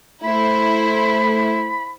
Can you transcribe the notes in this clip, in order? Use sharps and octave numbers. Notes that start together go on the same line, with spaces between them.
A3 E4 C5 B5